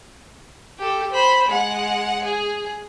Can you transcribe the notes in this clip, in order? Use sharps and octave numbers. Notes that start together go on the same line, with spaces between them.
G4 A4
C5 B5
G#3 F#5
G#4